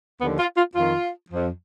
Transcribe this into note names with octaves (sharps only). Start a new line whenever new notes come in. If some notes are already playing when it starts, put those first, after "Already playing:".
D#2 D3 F3 B3
F4
F4
F2 D#3 F4
F2 F3